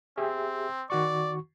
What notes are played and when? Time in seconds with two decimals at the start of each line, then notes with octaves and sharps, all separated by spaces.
0.17 C4 G4 G#4 E5
0.90 D#3 F#4 D5 C#6